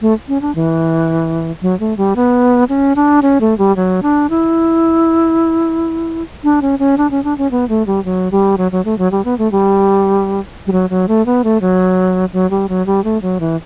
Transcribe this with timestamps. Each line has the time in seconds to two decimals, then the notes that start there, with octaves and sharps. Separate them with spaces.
0.01 A3
0.28 C#4
0.42 D4
0.55 E3
1.62 F#3
1.80 A3
1.97 G3
2.16 B3
2.69 C#4
2.96 D4
3.22 C#4
3.41 A3
3.58 G3
3.76 F#3
4.03 D4
4.30 E4
6.44 D4
6.62 C#4
6.79 C#4
6.98 D4
7.11 C#4
7.24 D4
7.38 C#4
7.51 B3
7.69 A3
7.87 G3
8.05 F#3
8.32 G3
8.58 F#3
8.72 F#3
8.85 A3
8.98 F#3
9.12 G3
9.25 B3
9.38 A3
9.52 G3
10.67 G3
10.72 F#3
10.90 F#3
11.08 A3
11.26 B3
11.44 A3
11.61 F#3
12.33 F#3
12.50 G3
12.69 F#3
12.86 G3
13.04 A3
13.22 F#3
13.40 E3